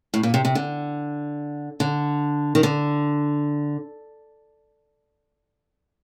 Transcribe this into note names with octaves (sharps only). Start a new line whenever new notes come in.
A2
A#2
C3
C3
D3
D3
D#3
D3